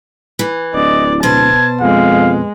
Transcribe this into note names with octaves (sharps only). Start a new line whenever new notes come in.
E3
D1 D5 D#5
B2 C5 A5 G#6
F2 G#3 F5